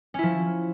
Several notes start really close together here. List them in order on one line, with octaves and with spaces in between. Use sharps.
C#4 E4 F3